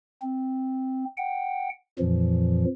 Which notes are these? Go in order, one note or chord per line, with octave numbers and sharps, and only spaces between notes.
C4
F#5 G5
F2 A#2 E3 F3